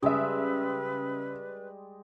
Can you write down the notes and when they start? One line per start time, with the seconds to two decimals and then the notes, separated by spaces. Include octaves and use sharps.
0.02 C#3 G3 G#3 B4 D#5 E5